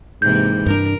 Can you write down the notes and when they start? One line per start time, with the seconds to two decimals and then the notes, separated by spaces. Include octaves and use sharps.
0.22 G#2 C3 E3 A#3 G6
0.66 G2 D4 A#4